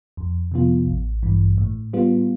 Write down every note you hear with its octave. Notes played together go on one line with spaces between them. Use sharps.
F2
C3 F3 B3 F4
A1
G2 E3
A2
G3 B3 F4